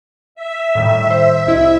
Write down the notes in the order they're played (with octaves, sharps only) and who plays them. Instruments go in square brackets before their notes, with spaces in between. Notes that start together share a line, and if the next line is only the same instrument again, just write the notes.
[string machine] E5
[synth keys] A2 D#3 G3
C5
C2 E4 D#5